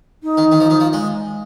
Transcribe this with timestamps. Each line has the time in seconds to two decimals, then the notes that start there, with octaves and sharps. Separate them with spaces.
0.23 D#4
0.37 D#3
0.52 D#3
0.60 F3
0.70 D#3
0.80 F3
0.93 G#3